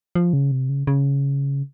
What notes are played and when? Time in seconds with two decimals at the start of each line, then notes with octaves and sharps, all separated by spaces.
0.15 F3
0.33 C#3
0.51 C3
0.69 C#3
0.87 C#3